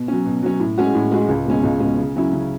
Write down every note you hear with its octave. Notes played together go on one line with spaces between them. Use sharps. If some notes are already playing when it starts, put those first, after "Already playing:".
Already playing: B2
F#3 C#4
B2
F#3 C#4
A2
G#3 C#4 F#4
A2
G#3 C#4 F#4
C#2
B2 G#3 C#4
C#2
B2 G#3 C#4
C#3
F#3 C#4 E4
C#3